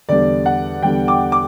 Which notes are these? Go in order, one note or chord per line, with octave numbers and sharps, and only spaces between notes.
E2 D3 G3 D5
F#5
E2 D3 G3 G5
D6
D6